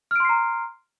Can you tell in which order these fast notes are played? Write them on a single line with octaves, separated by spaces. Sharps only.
F6 D7 C6 C7 A#5